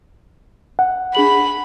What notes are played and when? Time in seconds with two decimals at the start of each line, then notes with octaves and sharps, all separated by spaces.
0.79 F#5
1.15 D4 G#4 B5 F#7